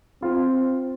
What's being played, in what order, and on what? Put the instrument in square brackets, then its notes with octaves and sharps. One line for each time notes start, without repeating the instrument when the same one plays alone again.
[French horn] C4 [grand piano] F4